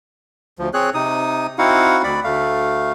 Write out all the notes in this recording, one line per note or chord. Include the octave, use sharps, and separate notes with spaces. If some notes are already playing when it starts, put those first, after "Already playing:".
D2 F3
C4 G#4 C#5 F#6
C3 D#4 D#6
C4 D#4 E4 F#4 F5 F#5
D2 D5 B5
D2 A3 F5